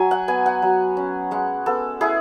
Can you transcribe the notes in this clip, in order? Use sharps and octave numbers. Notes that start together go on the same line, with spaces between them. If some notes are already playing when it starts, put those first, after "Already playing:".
Already playing: F#3 G#5
F#5
B3 G#5
F#5
F#3
C#4
G#3 F#5
B3 A4
E4 G#4